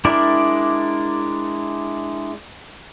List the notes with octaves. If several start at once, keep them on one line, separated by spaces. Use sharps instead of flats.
G#3 D4 E4 A#4 D5